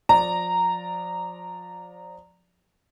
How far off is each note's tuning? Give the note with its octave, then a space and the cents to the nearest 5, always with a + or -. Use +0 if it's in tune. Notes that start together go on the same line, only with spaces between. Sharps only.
F3 +25 D5 +0 A#5 -10